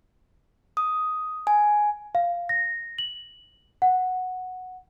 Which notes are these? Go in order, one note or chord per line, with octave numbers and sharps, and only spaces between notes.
D#6
G#5
F5
A#6
F#7
F#5